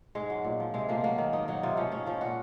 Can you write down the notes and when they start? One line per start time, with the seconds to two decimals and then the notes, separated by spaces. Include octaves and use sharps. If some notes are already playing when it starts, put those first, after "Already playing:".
0.15 G#2 G#3
0.30 F#3
0.44 A#2
0.60 F3
0.74 C3 G#3
0.89 F3 A#3
1.04 F#3 A#3
1.18 D#3
1.33 G#2 D#4
1.48 F#3 D#4
1.63 C3 F4
1.77 F3 C#4
1.92 G#2 C#4
2.07 F3 C#4
2.21 A#2 F#4